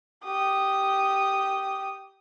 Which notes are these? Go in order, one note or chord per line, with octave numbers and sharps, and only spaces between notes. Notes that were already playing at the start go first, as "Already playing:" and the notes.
G4 D#6